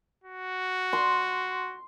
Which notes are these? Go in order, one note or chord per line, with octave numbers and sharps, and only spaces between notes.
F#4
C6